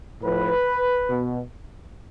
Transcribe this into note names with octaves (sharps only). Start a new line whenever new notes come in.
A2 F3 B4
B2